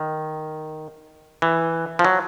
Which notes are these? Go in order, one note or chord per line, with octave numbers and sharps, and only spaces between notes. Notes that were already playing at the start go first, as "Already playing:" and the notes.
Already playing: D#3
E3
F3
F#3